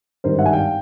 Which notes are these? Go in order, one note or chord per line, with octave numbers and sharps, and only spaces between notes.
G#1 G2 D#3 G3 A#4 C5
E5 F#5
G#5
F5 G5